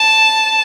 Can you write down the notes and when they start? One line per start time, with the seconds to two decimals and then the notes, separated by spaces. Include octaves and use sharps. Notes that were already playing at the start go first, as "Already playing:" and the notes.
Already playing: A5